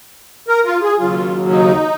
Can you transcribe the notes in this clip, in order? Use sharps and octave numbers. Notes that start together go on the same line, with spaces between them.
A#4
F4
G#4
D#2 C#3 F#3 F4
D#4